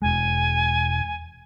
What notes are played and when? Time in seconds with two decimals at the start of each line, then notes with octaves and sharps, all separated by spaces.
0.02 E1 G#3 G#5